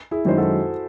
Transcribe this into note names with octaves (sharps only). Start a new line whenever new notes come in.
E4 G#4
F#2 D#3 G#3 C#4 C5
F#4 A4